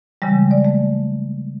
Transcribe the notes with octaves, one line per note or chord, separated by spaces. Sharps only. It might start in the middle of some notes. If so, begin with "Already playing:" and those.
C#3 E3 G3 G#3
D5
A3